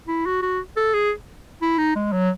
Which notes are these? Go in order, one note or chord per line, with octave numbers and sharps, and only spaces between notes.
E4
F#4
F#4
A4
G#4
E4
D#4
G#3
F#3